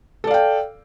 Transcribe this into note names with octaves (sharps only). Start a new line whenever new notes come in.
A4 D5 F5 G5